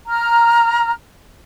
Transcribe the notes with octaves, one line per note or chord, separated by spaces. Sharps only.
A#5 F6